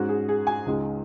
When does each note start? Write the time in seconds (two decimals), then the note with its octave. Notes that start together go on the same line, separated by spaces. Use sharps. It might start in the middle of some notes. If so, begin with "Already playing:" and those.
Already playing: G#2 G#3 C#4 F#4
0.09 G#4
0.29 G#4
0.47 G#5
0.66 C#2 C#3 G#3 D#4